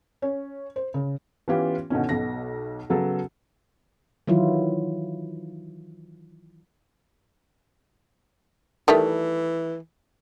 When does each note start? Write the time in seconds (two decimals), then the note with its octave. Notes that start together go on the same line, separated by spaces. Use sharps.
0.22 C#4
0.76 C5
0.94 C#3
1.48 E3 B3 C#4 F4 G4
1.90 B2 D3 D#3 C#4
2.09 B1 B2 A#6
2.90 C#3 F#3 B3 A4
4.27 D#3 E3 F#3 E4 F4
8.88 D#3 E3 G3 A3